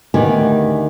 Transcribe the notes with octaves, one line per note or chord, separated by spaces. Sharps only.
D2 D#3 B3 G4 G#5